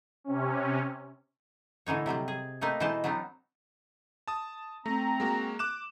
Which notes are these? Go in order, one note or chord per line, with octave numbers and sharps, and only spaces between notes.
C3 C#4
A2 D3 E3 D#4 C#5
C3 F#3 G3 C4
G#4
A3 A#3 C4 D#4 B4
B2 E3 G#3 D#4 C5 A5
F#3 B3 C4 D4 D#4
A5 D#6
A3 C4 A#5
G#3 A#3 F#4
D6 F#6 E7